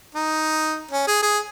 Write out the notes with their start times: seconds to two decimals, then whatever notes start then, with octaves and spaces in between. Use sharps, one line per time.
0.15 D#4
0.91 C#4
1.07 G#4
1.23 G#4